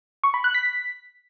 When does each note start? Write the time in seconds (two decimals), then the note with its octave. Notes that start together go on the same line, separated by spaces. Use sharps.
0.24 C#6
0.34 B5
0.44 F#6
0.54 B6